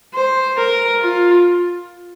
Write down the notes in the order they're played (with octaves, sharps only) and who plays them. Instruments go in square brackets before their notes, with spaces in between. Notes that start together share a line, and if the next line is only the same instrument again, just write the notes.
[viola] C5
A#4
F4